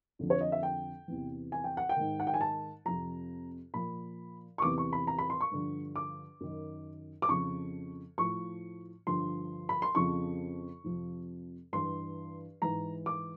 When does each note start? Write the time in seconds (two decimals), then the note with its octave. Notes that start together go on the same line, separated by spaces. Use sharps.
0.19 F2 D3 F3
0.30 C#5
0.41 D#5
0.52 E5
0.63 G5
1.08 E2 C3 E3
1.52 G#5
1.64 G5
1.77 F#5
1.89 G5
1.96 G#2 D#3
2.20 F#5
2.27 G5
2.34 G#5
2.41 A5
2.85 F2 C3 F3 A#5
3.74 A#2 F3 B5
4.58 C#6
4.62 E2 C3 E3 D6
4.78 C#6
4.93 B5
5.07 A#5
5.18 B5
5.30 C6
5.41 C#6
5.51 G2 D3 F3
5.96 D6
6.41 F#2 D#3
7.22 D6
7.29 F2 C#3 F3 C#6
8.18 A2 F3 C#6
9.07 G2 D3 F3 C6
9.69 B5
9.82 C6
9.95 F2 C#3 F3 C#6
10.84 F2 C3 F3
11.73 G2 E3 C6
12.62 G#2 E3 A#5
13.06 D6